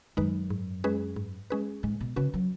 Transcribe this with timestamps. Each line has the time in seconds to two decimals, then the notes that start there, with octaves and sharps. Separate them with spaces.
0.17 F#2 D#3 G#3 D#4 B4
0.50 G#2
0.84 G#3 C#4 G#4 B4
1.16 G#2
1.50 G#3 C#4 G#4 B4
1.83 G#2 G#3
2.00 B2
2.16 C#3 C#4 F#4 B4
2.33 F#3